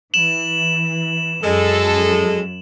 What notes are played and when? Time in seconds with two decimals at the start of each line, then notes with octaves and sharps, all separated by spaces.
0.14 E3 E7 F#7
1.43 F#2 G#3 A4